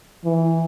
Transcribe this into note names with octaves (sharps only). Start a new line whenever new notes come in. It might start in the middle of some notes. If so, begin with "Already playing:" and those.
E3